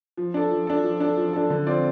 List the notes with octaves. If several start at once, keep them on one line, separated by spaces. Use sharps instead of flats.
F3
D4 A4
F3
D4 A4
F3
D4 A4
F3
D4 A4
D3
F3 C4 F4 D5